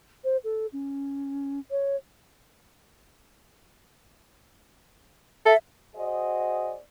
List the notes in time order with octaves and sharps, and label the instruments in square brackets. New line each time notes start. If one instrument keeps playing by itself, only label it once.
[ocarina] C5
A4
C#4
C#5
[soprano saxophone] A4 [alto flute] E5
[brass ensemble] F#4 G#4 C5 D5 D#5